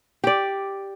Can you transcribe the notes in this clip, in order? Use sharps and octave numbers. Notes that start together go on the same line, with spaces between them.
G4 D5